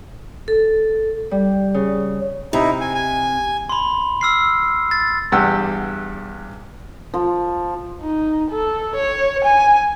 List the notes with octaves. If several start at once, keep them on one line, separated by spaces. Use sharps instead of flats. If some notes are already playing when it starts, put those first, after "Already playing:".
A4
G3
C#3
C3 D#4 E4
G#5
G#5
B5 C6
E6 F6 C7
A6
E2 G2 G4 F#5 E6
F3
D#4
A4
C#5
G#5